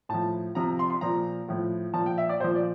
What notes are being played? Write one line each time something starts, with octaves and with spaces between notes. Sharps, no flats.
A2 F3 A5
C3 F3 A#5
C6
C6
A#2 F3 A#5
A2 F3
A#2 F3 A5
G5
E5
D5
A#2 F3 C5
D5